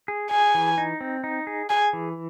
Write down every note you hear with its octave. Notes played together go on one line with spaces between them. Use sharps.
G#4
G#4 G#5
E3
D#4
C4
D#4
G#4
G#4 G#5
E3